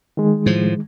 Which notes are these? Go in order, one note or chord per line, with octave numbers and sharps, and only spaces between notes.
D#3 G#3
A2 F3